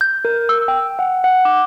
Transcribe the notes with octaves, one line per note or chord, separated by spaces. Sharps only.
G6
A#4
E6
G5
F#5
F#5
D6